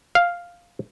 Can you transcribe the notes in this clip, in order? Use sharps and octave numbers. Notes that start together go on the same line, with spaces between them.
F5